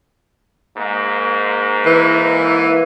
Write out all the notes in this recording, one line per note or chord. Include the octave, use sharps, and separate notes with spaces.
G#2 A#3
E3